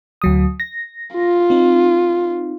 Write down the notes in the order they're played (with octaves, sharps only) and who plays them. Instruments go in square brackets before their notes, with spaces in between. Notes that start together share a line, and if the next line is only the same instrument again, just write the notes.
[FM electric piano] D2 F#3 D#6
A#6
[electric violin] F4
[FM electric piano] C4 D#4